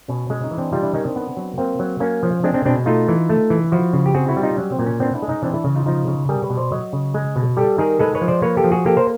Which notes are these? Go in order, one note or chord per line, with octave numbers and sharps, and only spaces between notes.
B2 C#4
G#3 C#4
C#4 D#4
E3
C4 D4
G3 D#4 F4
D4 E4
D#3 C#4 D#4
C4 D4
B3
F#3
A#3 C4
F#3
A#3 C#4
F3
G#3 C4 D4
C4 D4
B2 C4 D4
A3 D#4 F4
E3
A3
E3
F3 E4 F#4
C#3
G4
C4 F#4 G#4
E4 F#4
G3
D#4 F4
F#3 C#4
C4
A#2
C#4
B3 C4 D4
D4 E4
G#3
C#4 D#4
E3 C4 D4
D4 E4
C#3
D#4 F4
F3 D#4 F4
C#3
G3 G#4 A#4
B4 C#5
B2
C5 D5
F#3 C#5 D#5
C#3
G#3
B2
G3 G4 A4
D#3 G#4 A#4
G#3 A4 B4
B4 C#5
F3
C5 D5
A#3 B4 C#5
G4 A4
F3
F#4 G#4
A#3 G4 A4
A#4 C5